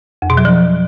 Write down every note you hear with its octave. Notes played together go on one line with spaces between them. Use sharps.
F2
B2
F#3
F3